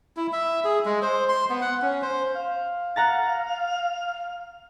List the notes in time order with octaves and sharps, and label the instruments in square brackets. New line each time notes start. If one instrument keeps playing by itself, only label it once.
[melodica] E4
E5
G#4
G#3
C5
C6
B3
F#5
C#4
C5
[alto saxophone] F5
[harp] F#5 A#5 A6